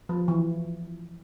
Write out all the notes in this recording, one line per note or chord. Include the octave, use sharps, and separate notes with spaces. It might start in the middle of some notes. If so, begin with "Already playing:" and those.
F3
E3